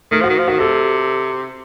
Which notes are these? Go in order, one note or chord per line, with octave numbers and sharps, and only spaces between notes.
D#3 A3
F3 F#4
D#3
F3
D#3 F#4
C3 A4